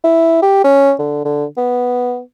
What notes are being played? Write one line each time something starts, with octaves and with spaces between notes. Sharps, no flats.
E4
G4
C#4
D3
D3
B3